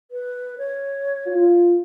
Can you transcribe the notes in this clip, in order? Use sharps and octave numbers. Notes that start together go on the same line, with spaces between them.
B4
C#5
F4